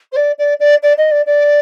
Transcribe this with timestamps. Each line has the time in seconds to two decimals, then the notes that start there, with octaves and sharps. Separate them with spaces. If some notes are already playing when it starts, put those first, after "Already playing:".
0.12 C5
0.16 D5
0.38 D5
0.59 D5
0.82 D5
0.97 D#5
1.11 D5
1.26 D5